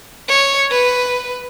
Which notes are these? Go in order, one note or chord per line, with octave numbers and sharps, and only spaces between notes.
C#5
B4